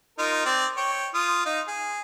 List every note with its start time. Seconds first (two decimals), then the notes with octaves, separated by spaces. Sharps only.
0.19 D#4 F4 A#4
0.46 C4 D5
0.77 C#5 G5
1.14 F4 D#6
1.46 D#4 F5
1.68 G#4